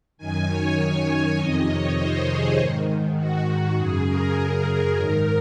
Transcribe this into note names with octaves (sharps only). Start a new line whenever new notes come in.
F#2 D#3 G#5
C#5
C#5
F2 C3 D#3 D#5
C#5
C5
G#4
G#2 D#3
F#4
F#2 C#3 G#4
A#4
G#2 D#3